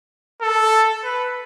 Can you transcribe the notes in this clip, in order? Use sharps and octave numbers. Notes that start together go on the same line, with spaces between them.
A4
B4